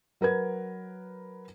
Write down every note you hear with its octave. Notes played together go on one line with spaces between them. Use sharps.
F#3 A#4 B4 G#6